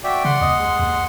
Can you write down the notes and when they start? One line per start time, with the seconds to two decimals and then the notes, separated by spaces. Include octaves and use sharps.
0.04 F#4 D5 E5 G5
0.25 C#3 F#5 C6
0.41 D#2 D#5
0.60 G#3
0.79 D#2